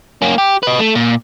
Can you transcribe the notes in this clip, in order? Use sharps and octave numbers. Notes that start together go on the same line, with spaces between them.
A#3 C#4
G4
B4 D#5
A3
A#2